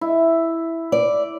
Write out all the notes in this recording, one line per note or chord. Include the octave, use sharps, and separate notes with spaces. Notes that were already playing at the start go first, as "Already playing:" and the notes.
E4
D5